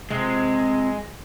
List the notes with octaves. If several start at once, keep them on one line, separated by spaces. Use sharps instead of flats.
C3 F3 G#3